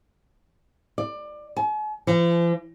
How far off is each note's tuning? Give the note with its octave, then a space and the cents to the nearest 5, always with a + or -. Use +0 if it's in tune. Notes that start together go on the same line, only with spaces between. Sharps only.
D5 +20
G#5 +45
F3 -45